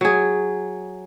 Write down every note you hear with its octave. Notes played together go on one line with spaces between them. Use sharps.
F#3 G#4